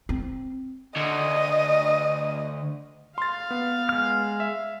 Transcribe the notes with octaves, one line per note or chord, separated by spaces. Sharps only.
C4
D2 D#5
F5 C6 A6
B3
G#3 F6
E5